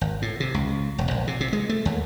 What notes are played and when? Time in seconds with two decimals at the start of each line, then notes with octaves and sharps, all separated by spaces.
0.01 G#1
0.22 A2
0.40 C3
0.54 C#2
0.98 E1
1.11 A#1
1.27 C3
1.41 C3
1.53 G#3
1.69 A3
1.85 D#2